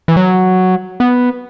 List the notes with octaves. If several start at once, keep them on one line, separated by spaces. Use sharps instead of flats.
E3
F#3
B3